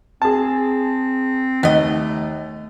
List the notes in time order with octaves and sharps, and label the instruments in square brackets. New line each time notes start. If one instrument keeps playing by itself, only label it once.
[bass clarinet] C4 [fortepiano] G#4 A5
[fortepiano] D#2 [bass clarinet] A3 [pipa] B3 D#5